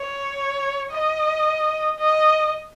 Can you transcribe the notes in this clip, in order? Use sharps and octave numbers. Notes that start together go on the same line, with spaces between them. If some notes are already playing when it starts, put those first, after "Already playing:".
Already playing: C#5
D#5
D#5